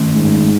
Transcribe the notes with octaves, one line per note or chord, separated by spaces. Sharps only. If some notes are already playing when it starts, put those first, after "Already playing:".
Already playing: D#3 A3 C#4
G#2